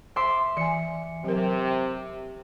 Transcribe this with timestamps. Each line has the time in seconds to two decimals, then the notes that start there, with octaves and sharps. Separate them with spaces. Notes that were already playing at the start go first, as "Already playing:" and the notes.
0.16 C5 E5 C6 D6
0.57 E3 G#5 C#7
1.24 C3 F#3 A#4